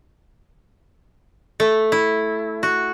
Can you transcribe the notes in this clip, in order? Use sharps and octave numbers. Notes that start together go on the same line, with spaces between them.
A3
E4
F#4